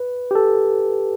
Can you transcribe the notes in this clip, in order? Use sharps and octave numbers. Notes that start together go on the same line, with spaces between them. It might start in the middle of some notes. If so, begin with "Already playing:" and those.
Already playing: B4
G4
A4